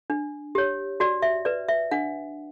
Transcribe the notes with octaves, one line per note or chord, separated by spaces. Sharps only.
D4
G4 C#5
F#4 D5
E5
B4 D5
E5
D4 F#5